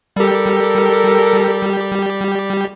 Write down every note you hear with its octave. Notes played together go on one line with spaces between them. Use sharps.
G3 G4 A4 A#4